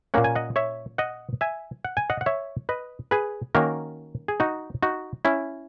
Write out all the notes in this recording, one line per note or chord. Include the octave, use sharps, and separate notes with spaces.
A#2 A#3 C#4 F#5
G#5
D#5 F#5
C#5 E5
D#5 F#5
E5 G#5
F#5
G#5
D#5 F#5
F#5
C#5 E5
B4 D#5
G#4 B4
D#3 A#3 C#4 F#4 A#4
G#4
D#4 F#4
D#4 F#4
C#4 E4